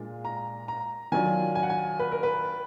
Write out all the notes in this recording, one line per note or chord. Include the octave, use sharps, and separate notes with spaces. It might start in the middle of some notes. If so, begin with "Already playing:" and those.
Already playing: A#2 G#3 D4 F4
A#5
A#5
D#3 F#3 D4 F4 G#5
G#5
F#5
G#5
B4
A#4
B4